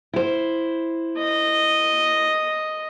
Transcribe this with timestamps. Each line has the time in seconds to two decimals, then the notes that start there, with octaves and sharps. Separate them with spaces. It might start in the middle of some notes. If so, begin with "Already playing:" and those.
0.13 E4 C5
1.18 D#5